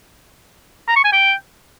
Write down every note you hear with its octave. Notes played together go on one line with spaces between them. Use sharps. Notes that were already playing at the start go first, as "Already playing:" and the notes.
A#5
C#6
G#5
G5